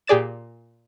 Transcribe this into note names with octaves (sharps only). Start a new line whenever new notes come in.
A#2 G4 G#4 D5 A6 E7